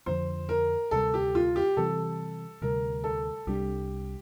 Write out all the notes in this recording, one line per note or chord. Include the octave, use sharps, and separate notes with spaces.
F2 D3 F3 C5
A#4
D2 C3 G3 A4
G4
F4
G4
C3 E3 G3 C4 A4
D2 C3 G3 A#4
A4
C2 C3 G3 D4 G4